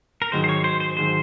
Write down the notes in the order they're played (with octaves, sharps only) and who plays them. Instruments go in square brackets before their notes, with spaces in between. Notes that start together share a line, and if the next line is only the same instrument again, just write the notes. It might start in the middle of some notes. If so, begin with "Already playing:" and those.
[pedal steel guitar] A#4
[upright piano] G#2 D#3 F#3 [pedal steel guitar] C5
[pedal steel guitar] C5
C#5
C5
C5
[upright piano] G#2 D#3 F#3 [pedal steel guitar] C5